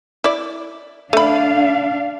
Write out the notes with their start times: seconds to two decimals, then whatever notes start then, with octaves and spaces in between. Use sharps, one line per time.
0.24 E4 D5
1.13 A3 D4 F5 B5